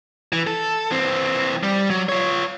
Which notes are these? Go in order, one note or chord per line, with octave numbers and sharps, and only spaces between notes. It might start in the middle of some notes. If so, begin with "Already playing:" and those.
E3
A4
E3 C4
G3
F#3
F4 C#5